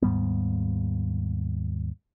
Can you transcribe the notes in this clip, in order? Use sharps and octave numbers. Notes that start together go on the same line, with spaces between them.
D#2 G#2 G3 B3